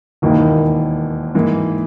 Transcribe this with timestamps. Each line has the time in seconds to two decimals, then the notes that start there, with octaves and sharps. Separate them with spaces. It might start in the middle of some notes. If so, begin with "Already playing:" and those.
0.22 E1 D#2 D#3 A#3 E4
1.35 G#2 E3 A#3